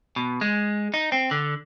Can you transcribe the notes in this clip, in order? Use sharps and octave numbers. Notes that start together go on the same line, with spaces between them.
B2
G#3
D#4
C4
D3